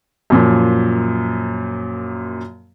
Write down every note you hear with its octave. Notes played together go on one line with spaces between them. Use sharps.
F#2 A#2 F3